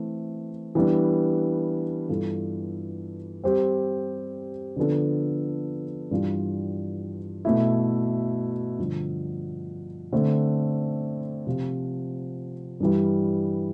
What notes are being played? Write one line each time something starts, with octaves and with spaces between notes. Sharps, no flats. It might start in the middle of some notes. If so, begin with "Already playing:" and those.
Already playing: E3 A3 C4 E4
E3 G3 B3 D4
G2 E3 B3 F4 A4
G3 C4 G4 C5
D3 F3 B3 D4 A4
G2 E3 G3 D4 F4
B2 A3 E4
G2 D3 F3
D3 A3 C4
C3 F3 C4 F4
G2 E3 G3